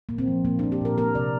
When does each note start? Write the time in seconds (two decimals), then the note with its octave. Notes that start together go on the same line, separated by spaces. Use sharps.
0.09 A#2 A#3
0.18 C4
0.27 F3
0.45 A#2 A#3
0.59 D4
0.63 A#3
0.72 G4
0.81 A#2 A#4
0.98 A#3 A#4
1.15 C3 D5